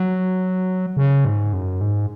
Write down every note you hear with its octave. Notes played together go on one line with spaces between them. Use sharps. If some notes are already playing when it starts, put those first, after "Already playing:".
Already playing: F#3
C#3
G#2
F#2
G#2